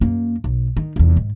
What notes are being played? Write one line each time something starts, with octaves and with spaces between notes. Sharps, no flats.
F#2 A#3
B1
D#3
F1 E2
G#2